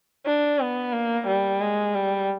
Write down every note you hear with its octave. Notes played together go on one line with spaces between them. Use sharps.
D4
B3
A#3
G3
G#3
G3